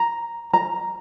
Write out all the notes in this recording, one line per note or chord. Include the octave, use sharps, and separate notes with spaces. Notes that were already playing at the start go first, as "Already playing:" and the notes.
Already playing: A#5
A#5